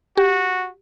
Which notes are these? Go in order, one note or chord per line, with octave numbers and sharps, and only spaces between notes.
F#4 G4